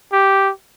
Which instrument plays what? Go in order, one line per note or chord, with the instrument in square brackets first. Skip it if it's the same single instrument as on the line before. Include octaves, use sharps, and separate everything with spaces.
[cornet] G4